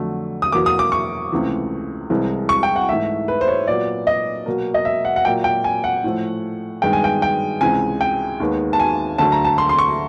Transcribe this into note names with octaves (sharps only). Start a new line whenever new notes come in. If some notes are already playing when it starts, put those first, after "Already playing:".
Already playing: F2 D3 F#3 A3
D#6
E2 B2 F#3 A#3 D6
D#6
D6
C#6
C#2 C3 E3 A3
C2 C3 E3 G#3
C#6
G5
F#5
G#2 E3 A3 E5
B4
C5
C#5
A#2 F#3 B3 D5
D#5
B2 F#3 A#3
D#5
E5
F#5
F#5
A#2 F#3 A#3 G5
G5
G#5
F#5
A2 F3 A3
G2 D#3 G#3 B3 G5
G#5
G5
G5
C#2 C3 E3 G#3 G#5
G5
D#2 D#3 G#3 B3
A5
G#5
D2 D3 F#3 A3 A5
A#5
A5
C6
C6
C#6